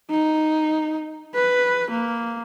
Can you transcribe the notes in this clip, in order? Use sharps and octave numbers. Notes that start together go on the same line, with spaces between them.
D#4
B4
A#3